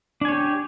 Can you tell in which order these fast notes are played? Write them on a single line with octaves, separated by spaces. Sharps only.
D4 G#5 C#5 G4